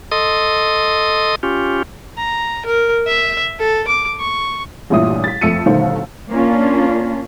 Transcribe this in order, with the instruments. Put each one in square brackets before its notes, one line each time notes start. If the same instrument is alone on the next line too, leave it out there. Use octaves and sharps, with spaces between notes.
[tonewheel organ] A4 D#5 C6 D#6
C#4 F4 G4
[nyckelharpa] A#5
A#4
E5
A4
D6
C#6
[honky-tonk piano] A1 G2 A#2 E4 D#6
A6 B6
F2 A3 E6 C#7 D#7
G1 B2 D#3 A3 C5 F5
[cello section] A#3 C#4 D4 F4